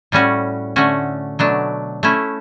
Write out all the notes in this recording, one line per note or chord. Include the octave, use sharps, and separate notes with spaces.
A2 G3 C#4 F#4
D3 A3 C#4 F#4
B2 F#3 A3 D4
A3 C#4 E4